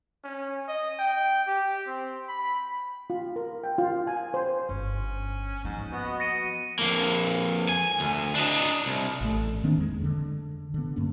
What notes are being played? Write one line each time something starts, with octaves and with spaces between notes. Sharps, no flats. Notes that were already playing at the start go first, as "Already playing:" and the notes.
C#4
D#5
G5
G4
C4
B5
F4
A#4
G5
F4
G#5
C5
G1 C#4
G#2 F3 A#3
B3 F#4 D#5
A#6 C#7 D#7
F2 A#3
G#5
D2
D4 D#5
C2
A1 A3
D#3 A#3 C4 D4
F2 G#3
D3
D3 B3
G2 A#3 C#4